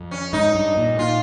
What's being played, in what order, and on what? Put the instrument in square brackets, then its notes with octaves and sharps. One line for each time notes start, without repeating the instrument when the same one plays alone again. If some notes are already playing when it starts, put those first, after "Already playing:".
Already playing: [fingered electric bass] F2
[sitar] C#4
[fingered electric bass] G#2 [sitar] D#4
[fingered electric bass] G2
A#2
[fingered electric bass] A#2 [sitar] F4